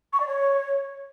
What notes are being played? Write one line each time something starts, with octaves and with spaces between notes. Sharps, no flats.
C#6
D5
C#5